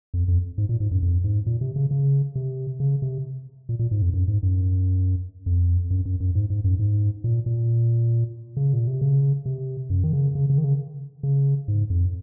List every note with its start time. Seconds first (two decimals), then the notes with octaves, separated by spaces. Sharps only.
0.14 F2
0.28 F2
0.58 G#2
0.69 A#2
0.80 G#2
0.91 F#2
1.03 F2
1.24 G#2
1.46 A#2
1.61 C3
1.76 C#3
1.91 C#3
2.36 C3
2.80 C#3
3.02 C3
3.69 A#2
3.79 A#2
3.91 G#2
4.02 F2
4.14 F#2
4.28 G#2
4.43 F#2
5.46 F2
5.91 F#2
6.05 F#2
6.20 F#2
6.35 G#2
6.50 G#2
6.64 F#2
6.79 G#2
7.24 A#2
7.46 A#2
8.57 C#3
8.73 A#2
8.87 C3
9.01 C#3
9.46 C3
9.90 F#2
10.04 D#3
10.13 C#3
10.35 C#3
10.50 C#3
10.58 D#3
10.64 C#3
11.23 C#3
11.68 G#2
11.90 F2